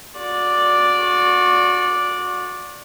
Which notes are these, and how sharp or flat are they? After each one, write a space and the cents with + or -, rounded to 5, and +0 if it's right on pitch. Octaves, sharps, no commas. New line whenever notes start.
F#4 -35 D5 +0